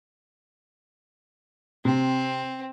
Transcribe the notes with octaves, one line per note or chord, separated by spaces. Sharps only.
C3 C4